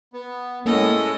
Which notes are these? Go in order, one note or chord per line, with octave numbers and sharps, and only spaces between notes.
B3
A2 G#3 A#3 C#4 A4 D#5